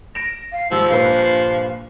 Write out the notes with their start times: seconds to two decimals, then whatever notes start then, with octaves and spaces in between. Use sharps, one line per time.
0.15 A#6 D7 E7
0.52 F5
0.71 G#2 D#3 F3 G3 E6
0.89 G2 A#2 B4 F5